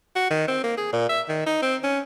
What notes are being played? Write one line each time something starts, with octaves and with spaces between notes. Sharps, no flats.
F#4
D#3
C4
A#3
G#4
A#2
E5
D#3
D#4
C4
C#4